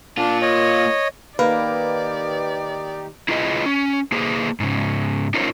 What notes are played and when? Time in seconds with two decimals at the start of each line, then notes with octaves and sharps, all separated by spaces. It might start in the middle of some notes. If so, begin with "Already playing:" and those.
0.17 A#3 D4 F4
0.42 C#5 D#5
1.39 D#3 A#3 D#4 G4 B4 D5
3.29 E4 F4 G#4 B4 D#5
3.66 C#4
4.12 A#3 G#4 B4 C5
4.60 G#2 C#3
5.34 C#4 D#4 F4 A#4 C5 C#5